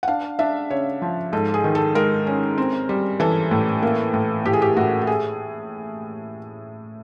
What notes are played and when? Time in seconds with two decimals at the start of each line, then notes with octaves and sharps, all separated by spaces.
0.03 F#5
0.08 D4 F5
0.39 D4 E5
0.70 C#3 C#5
1.02 F3
1.33 G#2 A4
1.54 G#4
1.64 D#3
1.75 A4
1.95 G#3 A#4
2.27 C#4
2.58 C4
2.89 G3
3.20 E3 A4
3.51 A2
3.83 A#3
4.14 A2
4.45 A2 G4
4.53 G#4
4.62 G4
4.77 A2 F#4
5.01 A4
5.07 G#4